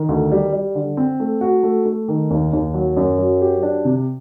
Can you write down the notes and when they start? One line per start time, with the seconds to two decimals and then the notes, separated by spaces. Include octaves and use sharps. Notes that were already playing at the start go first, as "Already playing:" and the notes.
Already playing: D#3
0.09 D2
0.31 G3
0.52 G3
0.75 D3
0.97 C4
1.20 A3
1.41 F#4
1.63 A3
1.85 A3
2.08 D#3
2.31 D#2
2.53 D#2
2.74 F#3
2.97 F#2
3.18 F#3
3.42 G4
3.63 D4
3.85 C3